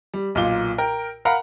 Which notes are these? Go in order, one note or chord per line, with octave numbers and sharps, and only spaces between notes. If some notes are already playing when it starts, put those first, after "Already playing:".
G3
B1 A#2 F4 G7
A#4 G5
A#4 F5 F#5 A#5 B5